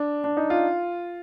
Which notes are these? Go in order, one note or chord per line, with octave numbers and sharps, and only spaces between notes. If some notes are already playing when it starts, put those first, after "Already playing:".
Already playing: D4
D4
D#4
F4